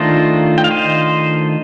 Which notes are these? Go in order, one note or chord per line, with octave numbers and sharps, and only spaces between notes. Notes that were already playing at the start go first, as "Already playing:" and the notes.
Already playing: D#3 A3 D4 F4 C5 D#5
G5
F5
C5 D#5